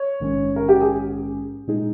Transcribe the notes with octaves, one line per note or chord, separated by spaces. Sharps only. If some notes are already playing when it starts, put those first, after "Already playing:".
Already playing: C#5
A#1 G#2 D#3 G#3 C#4
A#4
G4
G#4
A#2 G#3 D#4 G#4